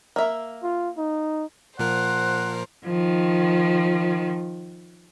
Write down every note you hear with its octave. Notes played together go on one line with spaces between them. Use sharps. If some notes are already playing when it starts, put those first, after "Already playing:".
A#3 E5
F4
D#4
A#2 F3 A#4 C5 F#5
D#3 F3